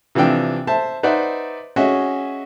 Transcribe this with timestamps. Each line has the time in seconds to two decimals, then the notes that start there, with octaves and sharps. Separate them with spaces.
0.15 C3 E3 F3 D4 G5
0.67 C5 E5 A5
1.03 D#4 B4 C5 D5 E5 F#5
1.76 C#4 F#4 G#4 D#5 E5